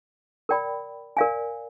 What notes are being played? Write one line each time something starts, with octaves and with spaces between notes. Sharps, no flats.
A#4 D5 G5 B5
A#4 D5 F5 G#5